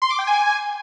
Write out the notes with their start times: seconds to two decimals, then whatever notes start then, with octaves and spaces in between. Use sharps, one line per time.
0.02 C6
0.10 D6
0.19 G5
0.27 G#5